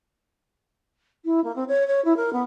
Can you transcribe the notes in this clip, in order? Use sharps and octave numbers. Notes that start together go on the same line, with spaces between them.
E4
A#3
C4
C#5
C#5
E4
A#4
B3